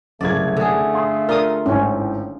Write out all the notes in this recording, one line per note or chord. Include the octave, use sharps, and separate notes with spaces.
F#1 C2 C#3 A3 D5 G#6
D3 G#4
F5 C6 D#6
D4 F4 A#4 D#6
G#1 A2 C#4